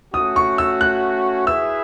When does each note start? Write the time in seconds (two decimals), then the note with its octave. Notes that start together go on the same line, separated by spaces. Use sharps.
0.14 A3 C#4 F#4 D#6
0.36 C#6
0.58 E6
0.81 F#6
1.47 E4 G#4 B4 E5 E6